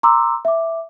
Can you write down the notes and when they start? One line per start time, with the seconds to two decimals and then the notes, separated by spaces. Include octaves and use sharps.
0.03 A#5 C6 D6 E6
0.45 E5 D6